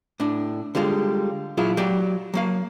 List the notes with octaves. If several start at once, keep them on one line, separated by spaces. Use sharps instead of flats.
A2 D4
D3 G3 G#3 F4
A#2 F#3 E4 F4 G#4
F#3 G4 D5
F#3 A#3 F5